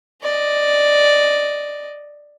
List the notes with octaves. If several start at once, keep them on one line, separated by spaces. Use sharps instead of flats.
D5 D#5